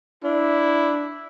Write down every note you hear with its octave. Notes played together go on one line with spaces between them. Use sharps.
D4 E4